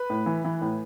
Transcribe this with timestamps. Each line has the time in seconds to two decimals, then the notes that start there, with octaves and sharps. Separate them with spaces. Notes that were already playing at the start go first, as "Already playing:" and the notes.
Already playing: B4
0.10 A2
0.26 E3
0.44 E3
0.62 A2